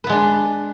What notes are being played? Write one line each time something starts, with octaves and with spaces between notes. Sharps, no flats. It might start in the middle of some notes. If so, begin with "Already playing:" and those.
G#3 B3 D4 B4